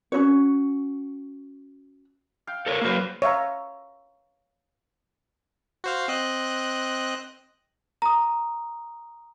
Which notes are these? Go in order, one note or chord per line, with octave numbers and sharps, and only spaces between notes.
C#4 D#4 F#4 C#5
F5 G5
A4 A#4 C#5
F#3 A#3 B4 C5 F5
C#5 E5 F5 A#5
F#4 C5 F5
C4 D#5 F#6
A#5 D#6